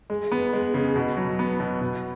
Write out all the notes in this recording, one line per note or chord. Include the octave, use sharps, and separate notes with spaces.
G#3
B3
G#3
C#3
B2
F#3
B3
B2
B2